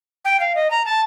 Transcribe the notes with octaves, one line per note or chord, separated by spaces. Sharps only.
G5
F5
D#5
A#5
A5